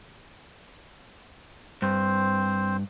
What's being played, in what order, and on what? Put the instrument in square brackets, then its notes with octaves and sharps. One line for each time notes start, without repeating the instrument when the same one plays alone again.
[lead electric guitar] G2 [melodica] C4 C5